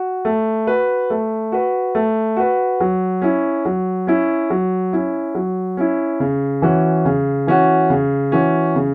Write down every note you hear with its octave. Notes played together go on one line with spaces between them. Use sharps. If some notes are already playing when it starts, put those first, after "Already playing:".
Already playing: F#4
A3
F#4 B4
A3
F#4 B4
A3
F#4 B4
F#3
C#4 E4
F#3
C#4 E4
F#3
C#4 E4
F#3
C#4 E4
C#3
E3 C#4 F#4
C#3
E3 C#4 F#4
C#3
E3 C#4 F#4
C#3